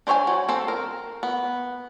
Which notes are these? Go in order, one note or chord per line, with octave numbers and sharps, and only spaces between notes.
D4 C5 C#5 E5 G#5
F#3
C4 A4 C5
A#4
B3